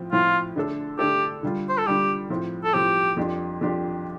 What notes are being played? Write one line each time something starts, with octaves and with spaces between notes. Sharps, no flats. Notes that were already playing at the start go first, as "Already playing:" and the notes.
Already playing: A2 F3 C4
A2 F3 C4 F4
D3 A3 D4 A4
D3 A3 D4 G4 A4
D3 G3 F4
C5
A4
D3 G3 F4 G4
A2 F3 C4
A4
A2 F3 C4 G4
F2 F3 D4 G4
F2 F3 D4 G4